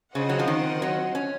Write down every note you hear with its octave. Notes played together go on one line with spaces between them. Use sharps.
C#3 C4 F4 C5 D#5 F#5
F#3
F3
D#3
F#3
C#4